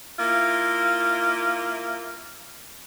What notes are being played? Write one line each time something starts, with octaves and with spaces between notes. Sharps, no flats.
A#3 E4 F4